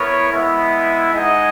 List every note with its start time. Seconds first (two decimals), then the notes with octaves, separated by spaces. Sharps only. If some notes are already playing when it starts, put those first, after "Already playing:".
Already playing: B3 E4 A#4 C#5
0.32 G#3 B3 E4
1.11 G#3 D#4 G#4 D#5 F#5